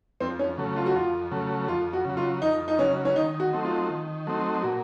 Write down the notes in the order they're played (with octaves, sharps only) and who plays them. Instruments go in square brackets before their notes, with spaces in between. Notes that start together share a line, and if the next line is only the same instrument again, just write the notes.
[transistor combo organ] F2 [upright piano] C4
[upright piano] C#4
[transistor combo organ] C#3 F#3 A3
[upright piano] F4
F#4
[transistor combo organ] F2 [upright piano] F4
[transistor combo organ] C#3 F#3 A3
[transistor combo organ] F2 [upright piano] F4
[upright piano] F#4
[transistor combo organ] C#3 F#3
[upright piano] F4
[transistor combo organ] F2 [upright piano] D#4
[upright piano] D#4
[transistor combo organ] C#3 F#3 [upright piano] C#4
[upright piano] C#4
[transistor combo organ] D#3 [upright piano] D#4
[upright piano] F#4
[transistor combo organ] F#3 A3 C4 D#4
[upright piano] F4
[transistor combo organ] D#3
F#3 A3 C4 D#4
[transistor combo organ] A#2 [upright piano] F#4